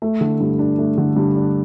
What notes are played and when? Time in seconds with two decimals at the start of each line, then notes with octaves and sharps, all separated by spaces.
0.02 A3
0.21 D3
0.40 G2
0.59 D4
0.79 A3
0.98 D3
1.16 G2
1.36 D4